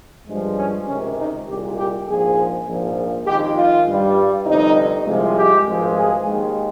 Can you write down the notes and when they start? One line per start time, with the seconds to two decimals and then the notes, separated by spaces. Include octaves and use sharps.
0.27 G2 F3 G#3
0.58 C#4
0.87 C#2 C3 D#3 C#4
1.18 D#4
1.48 C2 A#2 G#3 G4
1.77 G4
2.07 A#1 G#2 F3 G#4
2.67 A#1 G#2 F3
3.27 F2 D#3 G#3 G4
3.56 F4
3.87 G2 G3
4.46 G1 F2 C3 D#4
5.06 C2 C3 F3 G#3
5.36 G4
5.66 G#1 G2 F3 G#3
5.96 G#4
6.26 D#2 D#3 G#3